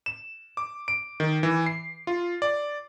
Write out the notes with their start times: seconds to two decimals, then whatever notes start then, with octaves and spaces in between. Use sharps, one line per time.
0.06 E7
0.57 D6
0.88 D7
1.20 D#3
1.43 E3
1.66 C7
2.07 F4
2.42 D5